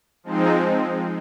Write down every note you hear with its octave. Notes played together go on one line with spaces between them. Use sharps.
F3 G#3 C4 D#4